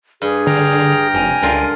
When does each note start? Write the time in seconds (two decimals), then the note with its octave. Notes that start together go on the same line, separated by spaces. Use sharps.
0.22 G2 G#4
0.47 D3 G5 A#5 F6
1.14 F1 G#5
1.42 C#2 D3 F4 A#4